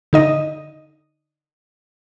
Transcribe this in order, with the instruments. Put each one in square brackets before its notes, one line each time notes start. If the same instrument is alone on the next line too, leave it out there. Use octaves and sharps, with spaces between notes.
[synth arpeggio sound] D3 D#4 D#5